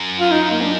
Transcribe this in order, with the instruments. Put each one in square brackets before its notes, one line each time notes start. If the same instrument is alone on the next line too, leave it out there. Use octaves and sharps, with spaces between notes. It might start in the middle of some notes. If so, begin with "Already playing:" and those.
Already playing: [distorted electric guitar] F#2
[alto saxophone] F4
D#4
A#3
D4